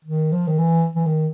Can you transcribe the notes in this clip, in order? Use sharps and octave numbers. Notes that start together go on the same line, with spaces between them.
D#3
F3
D#3
E3
E3
D#3